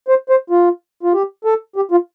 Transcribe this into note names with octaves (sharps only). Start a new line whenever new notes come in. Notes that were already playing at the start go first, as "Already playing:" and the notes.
C5
C5
F4
F4
G4
A4
G4
F4